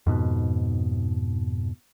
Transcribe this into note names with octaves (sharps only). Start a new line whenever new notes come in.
F2 G#2 B2